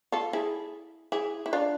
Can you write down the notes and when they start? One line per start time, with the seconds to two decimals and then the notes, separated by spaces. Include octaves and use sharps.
0.12 F4 A4
0.33 E4 G#4
1.12 E4 G#4
1.46 E4
1.53 D4 F4